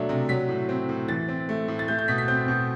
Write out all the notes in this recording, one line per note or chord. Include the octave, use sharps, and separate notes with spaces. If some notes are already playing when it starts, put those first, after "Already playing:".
Already playing: B2 F#3 A3 D4
C3
F#3 B6
A2
C4
A2
E3 A6
C4
A3
A2
A6
A3 G6
G6
B2 B6
B6
C4 G6
B2